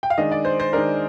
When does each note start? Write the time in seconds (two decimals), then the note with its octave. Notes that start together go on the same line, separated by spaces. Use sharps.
0.03 G5
0.10 F5
0.18 D#3 G#3 D4 D#5
0.32 D5
0.45 C5
0.60 C5
0.73 D#3 G#3 D4 A#4